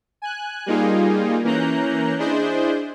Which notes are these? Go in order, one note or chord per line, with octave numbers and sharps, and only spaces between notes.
G#5 F#6
G3 A#3 D#4 F4 G#4
E3 A#3 C#4 A#5 F#6 G6
D4 E4 G#4 C5 D#5 G6